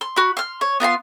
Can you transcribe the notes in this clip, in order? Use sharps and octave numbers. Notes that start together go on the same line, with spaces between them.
C6
F#4 B5
C6 F6
C#5
B3 F4 A#5 C6